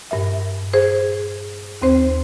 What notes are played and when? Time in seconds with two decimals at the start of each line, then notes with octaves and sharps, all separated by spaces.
0.11 G2 A#2 E5
0.73 G#4 C5
1.82 D#2 C4 C5